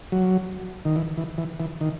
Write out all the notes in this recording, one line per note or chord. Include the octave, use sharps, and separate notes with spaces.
F#3
D#3
E3
E3
E3
E3
D#3